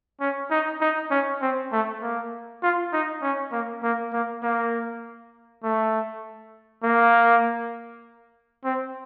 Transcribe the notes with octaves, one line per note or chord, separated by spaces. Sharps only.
C#4
D#4
D#4
C#4
C4
A3
A#3
F4
D#4
C#4
A#3
A#3
A#3
A#3
A3
A#3
C4